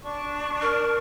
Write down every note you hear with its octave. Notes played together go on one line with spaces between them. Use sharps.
D4 C#6
A#4